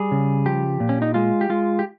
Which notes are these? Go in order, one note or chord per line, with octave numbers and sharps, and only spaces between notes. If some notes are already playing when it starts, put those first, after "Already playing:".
Already playing: G3 G#4
C#3
F3 G4
A#2
C#4
D#4
G#3 F4
G4
G#3 F4
G4